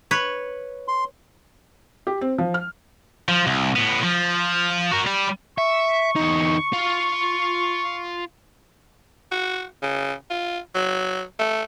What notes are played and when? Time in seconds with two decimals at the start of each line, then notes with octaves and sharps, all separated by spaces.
0.11 B4 C#5
0.88 C6
2.07 G4
2.21 C4
2.38 F3
2.54 F6
3.28 F3
3.47 C2
3.76 A2 B3
4.03 F3
4.91 F#4 A#4
5.07 G3
5.58 E5 C#6
6.16 E2 D#4
6.73 F4
9.31 F#4
9.82 C#3
10.30 F4
10.75 F#3
11.39 A3